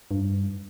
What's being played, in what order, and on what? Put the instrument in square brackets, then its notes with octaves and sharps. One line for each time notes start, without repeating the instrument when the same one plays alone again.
[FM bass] G2